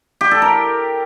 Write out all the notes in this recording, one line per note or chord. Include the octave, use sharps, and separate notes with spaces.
G4
A4
A#4